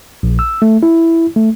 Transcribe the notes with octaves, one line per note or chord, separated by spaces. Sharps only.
A#1
E6
A3
E4
A3